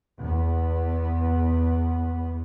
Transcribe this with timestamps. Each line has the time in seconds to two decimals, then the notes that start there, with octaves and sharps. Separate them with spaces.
0.19 E2 B3